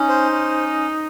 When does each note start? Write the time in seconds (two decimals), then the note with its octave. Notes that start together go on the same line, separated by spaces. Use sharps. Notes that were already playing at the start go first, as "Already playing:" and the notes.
Already playing: C#4 D#4
0.08 C5
0.32 C#4